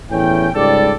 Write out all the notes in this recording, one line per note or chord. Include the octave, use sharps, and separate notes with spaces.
E2 A2 E3 C#4 G5
C#2 G#2 G3 G4 A4 D5